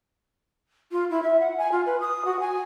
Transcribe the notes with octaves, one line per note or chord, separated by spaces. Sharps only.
F4
E4
E5
F#5
G#5
F4
B4
D#6
F#4
G#5